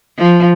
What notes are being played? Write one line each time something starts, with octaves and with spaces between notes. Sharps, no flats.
F3